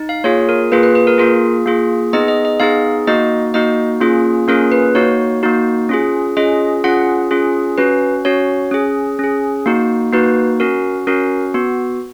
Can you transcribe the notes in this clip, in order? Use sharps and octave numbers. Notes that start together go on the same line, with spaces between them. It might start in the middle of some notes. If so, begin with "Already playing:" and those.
Already playing: D#4
F5
A#3 F4 G#4 C#5
A#4
A#3 F4 G#4 B4
B4
B4
A#4
A#3 F4 G#4 A#4
A#3 F4 G#4
B3 D#4 G#4 D#5
D#5
D#5
B3 D#4 G#4 F5
A#3 D#4 F#4 D#5
A#3 D#4 F#4 D#5
A#3 C#4 F4 G#4
A#3 C#4 F4 G#4 A#4
B4
A#3 D#4 F#4 C#5
A#3 D#4 F#4
C#4 F4 G#4
C#4 F4 G#4 D#5
C#4 F4 G#4 F#5
C#4 F4 G#4
C#4 F#4 B4
C#4 F#4 C#5
C#4 G#4
C#4 G#4
A#3 D#4 F#4
A#3 D#4 F#4 B4
C#4 F#4 A#4
C#4 F#4 A#4
B3 F#4